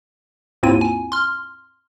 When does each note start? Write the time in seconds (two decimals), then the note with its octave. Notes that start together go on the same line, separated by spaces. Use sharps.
0.63 D#2 G#2 C4 E4 F4 D#7
0.81 G#5
1.12 C6 F6